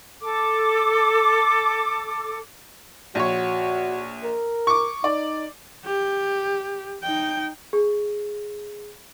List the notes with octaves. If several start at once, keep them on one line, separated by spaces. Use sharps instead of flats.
A4 D6
A#1 F#4 C#5
A#4
C#6 D6
D#4 D5
G4
D#4 G5
G#4